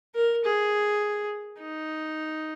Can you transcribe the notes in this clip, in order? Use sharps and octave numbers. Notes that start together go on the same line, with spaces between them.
A#4
G#4
D#4